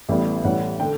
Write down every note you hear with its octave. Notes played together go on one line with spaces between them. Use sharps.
A1 A2 G3 B3
A1 A2 G3 C#4 F#5
D3 A3 D4 G5